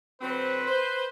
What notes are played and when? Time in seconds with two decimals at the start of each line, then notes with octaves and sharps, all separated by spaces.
0.21 D3 F#3 C4 B4
0.67 C5